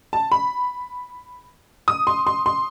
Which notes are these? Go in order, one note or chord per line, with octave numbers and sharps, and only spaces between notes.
A5
B5
D#6
C6
C6
C6